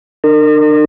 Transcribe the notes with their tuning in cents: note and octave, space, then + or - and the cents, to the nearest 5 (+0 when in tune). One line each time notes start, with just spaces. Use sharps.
D4 +40 A#4 -30